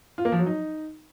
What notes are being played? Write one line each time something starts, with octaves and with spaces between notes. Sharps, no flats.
F4
A#3
F3
F#3
D#4